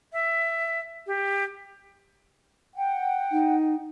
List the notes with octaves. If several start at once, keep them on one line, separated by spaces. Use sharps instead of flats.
E5
G4
F#5 G5
D#4